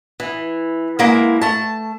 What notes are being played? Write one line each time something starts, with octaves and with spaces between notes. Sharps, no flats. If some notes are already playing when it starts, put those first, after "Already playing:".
E3
G#3 A#3 E4
A3 A5